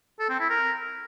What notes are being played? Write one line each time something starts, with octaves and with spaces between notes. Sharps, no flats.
A4
C4
E4
A#4